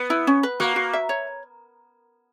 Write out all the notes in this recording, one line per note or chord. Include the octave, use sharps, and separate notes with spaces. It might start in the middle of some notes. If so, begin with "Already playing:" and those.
Already playing: B3
E4
C#4
B4
A#3 F#4
F#4
E5
C#5